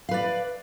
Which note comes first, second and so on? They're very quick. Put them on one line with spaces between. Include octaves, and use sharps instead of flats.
F5 B4 D5